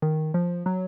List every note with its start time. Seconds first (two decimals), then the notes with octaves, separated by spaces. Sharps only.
0.02 D#3
0.34 F3
0.66 F#3